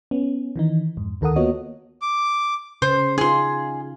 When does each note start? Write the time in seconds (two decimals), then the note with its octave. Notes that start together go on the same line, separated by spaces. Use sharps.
0.11 B3 C#4
0.56 D#3 E3 D#4
0.97 F2 G#2
1.21 D2 D#3 A4 A#4 F#5 D#6
1.36 A#3 B3 F4 F#4 C#5 D#5
2.02 D6
2.82 C#3 C5
3.18 D#4 F4 G#4 C6